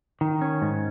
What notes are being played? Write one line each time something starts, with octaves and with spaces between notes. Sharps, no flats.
D#3
C#4
G#2